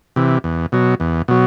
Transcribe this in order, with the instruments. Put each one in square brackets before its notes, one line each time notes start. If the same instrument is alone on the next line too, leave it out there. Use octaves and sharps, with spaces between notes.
[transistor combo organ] C3 E3
E2
B2 F#3
E2
B2 F#3